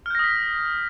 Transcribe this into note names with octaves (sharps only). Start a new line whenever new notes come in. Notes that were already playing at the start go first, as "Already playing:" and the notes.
D#6 F6 G6 A#6 B6